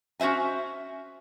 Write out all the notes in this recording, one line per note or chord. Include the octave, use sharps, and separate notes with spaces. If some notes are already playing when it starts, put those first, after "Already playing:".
C#4 F#4 C5 E5 G#5